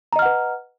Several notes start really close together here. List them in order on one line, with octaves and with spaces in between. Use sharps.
A#5 D#5 F6 F#5 B4